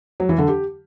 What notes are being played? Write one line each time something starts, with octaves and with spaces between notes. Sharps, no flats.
F#3
E3
D3
G4